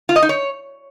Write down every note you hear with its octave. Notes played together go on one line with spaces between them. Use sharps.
F4
D#5
D#4
C#5